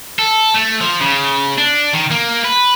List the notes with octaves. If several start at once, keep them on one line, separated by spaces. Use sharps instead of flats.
A4
A3
F3
C#3
D4
D#3
A#3
B4